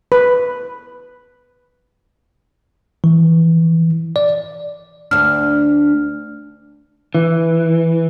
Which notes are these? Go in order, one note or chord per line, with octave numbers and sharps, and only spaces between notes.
B4
E3
D5
D2 D4 F6
E3